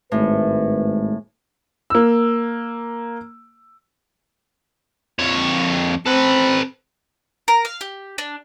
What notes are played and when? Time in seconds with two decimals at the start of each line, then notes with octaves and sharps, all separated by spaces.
0.12 G#1 A2 G#3 B4
1.90 A#3 E6
5.19 F2 C#5
6.06 C4 A4 B4
7.48 A#4
7.65 F5
7.81 G4
8.18 D4